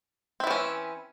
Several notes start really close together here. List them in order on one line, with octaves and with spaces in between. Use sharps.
C4 E4 E3 C#4